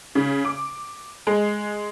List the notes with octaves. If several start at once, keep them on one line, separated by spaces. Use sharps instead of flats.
C#3
D6
G#3